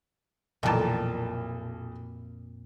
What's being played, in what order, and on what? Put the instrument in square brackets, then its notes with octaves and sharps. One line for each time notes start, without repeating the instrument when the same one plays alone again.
[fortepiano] B1 E3 A5 [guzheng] F2 A#2